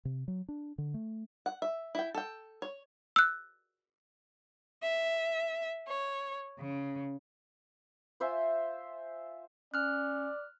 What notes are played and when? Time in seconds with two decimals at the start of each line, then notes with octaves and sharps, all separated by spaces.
0.05 C3
0.28 F#3
0.49 D4
0.78 D3
0.94 A3
1.46 F#5
1.62 E5
1.95 E4 G5
2.15 A4 G5
2.62 C#5
3.16 E6 F#6
4.82 E5
5.87 C#5
6.59 C#3
8.20 F4 C5 E5 G#5
9.74 C#4 D5 F6 F#6